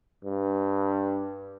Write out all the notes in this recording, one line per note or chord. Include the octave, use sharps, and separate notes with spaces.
G2